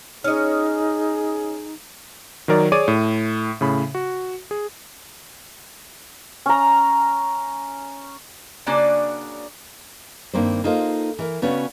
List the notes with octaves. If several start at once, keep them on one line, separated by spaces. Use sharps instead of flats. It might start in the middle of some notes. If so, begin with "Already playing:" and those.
C#4 D#4 G#4 D#5
D#3 F#3 A#4 D5
G#4 C#5 D5 D6 D#7
A2
A2 C#3 B5
F#4
G#4
C#4 A#5
C#3 A#3 D4 F#4 D5 G#5
G2 D#3 A#3 C4 C5
A#3 D#4 F4 A4 C5
E3 A#4
C#3 B3 C#4 D4 F#4 B4